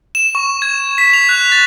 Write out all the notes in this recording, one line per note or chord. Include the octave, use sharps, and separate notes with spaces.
E7
C#6
G#6
B6
F7
F#6
A6